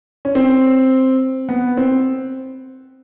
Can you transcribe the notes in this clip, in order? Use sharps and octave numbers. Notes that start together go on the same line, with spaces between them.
C#4
C4
B3
C4